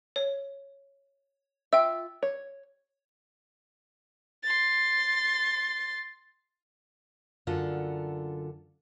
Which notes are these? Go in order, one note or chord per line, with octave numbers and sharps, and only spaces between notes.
C#5
F4 E5 G5 E6
C#5
C6 A6
F#2 D3 F4 A4 F#5